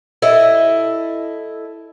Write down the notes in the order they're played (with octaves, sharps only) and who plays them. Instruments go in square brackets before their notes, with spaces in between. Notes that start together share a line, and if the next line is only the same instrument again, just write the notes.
[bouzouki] E4 A4 D#5